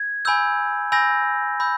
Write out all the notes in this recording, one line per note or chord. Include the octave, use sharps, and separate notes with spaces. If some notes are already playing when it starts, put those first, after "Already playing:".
Already playing: G#6
G#5 B5 E6 G6
G#5 B5 E6 G6 A#6
B5 E6 G6